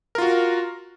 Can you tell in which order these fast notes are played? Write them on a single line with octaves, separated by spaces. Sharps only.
A#4 F4 F#4